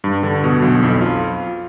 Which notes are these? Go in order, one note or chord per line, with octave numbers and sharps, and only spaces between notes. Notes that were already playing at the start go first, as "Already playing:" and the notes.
G2
D3
B2
B1
F2
F4